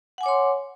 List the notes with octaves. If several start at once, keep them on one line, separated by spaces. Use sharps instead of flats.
C#5 F#5 G#5 C6 D6